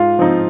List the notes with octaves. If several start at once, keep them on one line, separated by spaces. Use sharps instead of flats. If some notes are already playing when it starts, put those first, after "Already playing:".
Already playing: G#2 F4
F3 C4 D#4